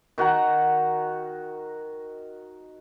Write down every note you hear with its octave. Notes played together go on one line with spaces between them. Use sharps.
D#3 F#4 F#5 A#5